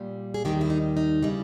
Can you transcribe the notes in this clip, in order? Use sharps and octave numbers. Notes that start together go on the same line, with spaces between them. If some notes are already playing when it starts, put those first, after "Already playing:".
Already playing: A#2 G3
G#4
D#2 D#3 G3 G4
E4
D#4
D#4
C#3 E3 G3